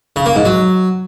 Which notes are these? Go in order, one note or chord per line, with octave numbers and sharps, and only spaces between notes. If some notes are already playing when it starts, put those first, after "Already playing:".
C#3
A#3
G#2
F#3